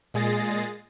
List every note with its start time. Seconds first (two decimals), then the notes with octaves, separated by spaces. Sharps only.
0.14 A#2 G#3 G#4 A6 A#6 C7